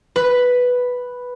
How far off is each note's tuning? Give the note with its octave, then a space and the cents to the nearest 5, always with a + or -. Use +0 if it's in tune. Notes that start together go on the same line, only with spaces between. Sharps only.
B4 +0